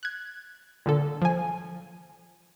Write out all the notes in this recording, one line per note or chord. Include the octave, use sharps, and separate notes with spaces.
F#6 G#6
A#2 D3 A4
F3 G#5